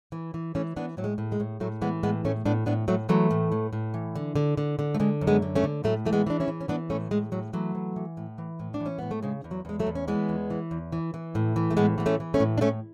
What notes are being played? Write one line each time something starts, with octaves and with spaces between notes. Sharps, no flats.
E3
E3
E3 A3 C#4
E3 B3 D4
A2 F#3
G#3
A2
G#3
A2
A2 F#3 A3
E3 G#3 B3
A2 G#3 B3
A2 A3 C#4
A2 B3 D4
A2 B3 D4
A2 F#3 A3
E3 F#3 A3
A2
A2
A2
E3
D3
D3
D3
D3
A3
D3 G#3
F#2
G#3 B3
D3
A3 C#4
D3
A2 F#3 A3
E3 A3
G#3 B3
E3 D4
C#4 E4
E3
C#4
E3 B3 D4
A2 A3 C#4
A2 G#3
A2 F#3
E3 F#3 A3
E3
E3
A2
E3
A2
D4
E3
C#4
A2 B3
A3
C#3 G#3
E2
F#3
E2 G#3
F#3 A3
E2
C#4
E3 G#3 B3
E2
E3
E2
E3
E3
A2
E3
A3
A2 G#3 B3
E3 B3
A3 C#4
E3
A3 C#4
A2
D4
A2 A3 C#4